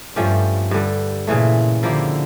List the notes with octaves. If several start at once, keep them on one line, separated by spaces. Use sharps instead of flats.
G2 F3 A3 C#4 G4
G2 D3 G3
A#2 C#3 E3 A3
D3 F3 A#3 E4 G4